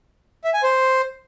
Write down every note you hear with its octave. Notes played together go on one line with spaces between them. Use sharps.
E5
G#5
C5